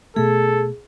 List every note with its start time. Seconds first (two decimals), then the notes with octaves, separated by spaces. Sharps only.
0.16 B2 A3 G#4 A4